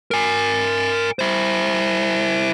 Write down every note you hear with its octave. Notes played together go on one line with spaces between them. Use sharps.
A#4 G#5
E4 C5